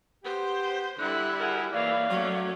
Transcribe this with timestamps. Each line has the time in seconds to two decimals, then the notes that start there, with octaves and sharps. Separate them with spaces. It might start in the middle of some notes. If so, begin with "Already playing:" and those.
0.24 B3 G4 C5
0.99 D3 G3 E4 F#6
1.41 F#4 G#4 A#4
1.73 E3 A#3 C#5 D5 F5
2.10 F#3 A3 C#4